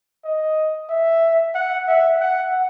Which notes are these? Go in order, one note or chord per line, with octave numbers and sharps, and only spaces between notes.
D#5
E5
F#5
E5
F#5